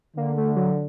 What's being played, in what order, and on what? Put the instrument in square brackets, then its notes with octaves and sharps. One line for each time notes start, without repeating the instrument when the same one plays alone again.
[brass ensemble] D3 [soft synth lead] A#3
[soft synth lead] A3
F#3